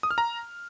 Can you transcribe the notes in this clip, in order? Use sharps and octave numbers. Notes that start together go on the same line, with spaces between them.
D#6
F6
A#5